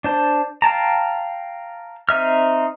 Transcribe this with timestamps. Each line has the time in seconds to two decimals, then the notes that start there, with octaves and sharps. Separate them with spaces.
0.04 D4 C5 A5
0.62 F5 G5 A5 A#5
2.09 C4 D#4 E5 F6